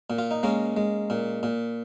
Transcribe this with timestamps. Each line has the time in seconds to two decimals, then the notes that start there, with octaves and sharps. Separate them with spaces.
0.10 A#2
0.18 F4
0.31 D#4
0.43 G#3 A#3 C#4
0.77 G#3
1.10 A#2
1.43 A#2